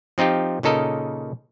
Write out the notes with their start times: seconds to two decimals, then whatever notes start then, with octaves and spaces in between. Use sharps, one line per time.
0.18 F3 C4 D#4 F4 G4
0.63 A#2 C#3 D#4 A4 A#4 D#5